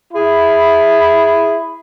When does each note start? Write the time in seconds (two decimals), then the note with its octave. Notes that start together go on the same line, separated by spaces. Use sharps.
0.12 E4 G#4 B5